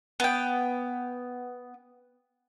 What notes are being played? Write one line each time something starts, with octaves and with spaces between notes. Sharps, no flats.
B3 G5